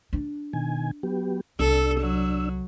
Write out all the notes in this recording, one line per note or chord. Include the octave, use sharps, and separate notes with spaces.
D4
B2 D#3 G#5
F#3 B3 G4
C2 D4 A4 E6
F#3